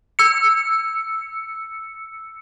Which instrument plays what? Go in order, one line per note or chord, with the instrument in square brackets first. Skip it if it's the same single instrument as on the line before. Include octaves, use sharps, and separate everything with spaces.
[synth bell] E6 C#7